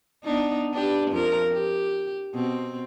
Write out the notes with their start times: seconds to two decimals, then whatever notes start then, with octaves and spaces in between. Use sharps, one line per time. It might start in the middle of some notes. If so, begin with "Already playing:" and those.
0.24 B3 D4 D#4
0.73 D4 G4 B4
1.11 F2 F3 A#4
1.52 G4
2.34 B2 C4